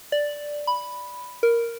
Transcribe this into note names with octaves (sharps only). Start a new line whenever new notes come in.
D5
B5
A#4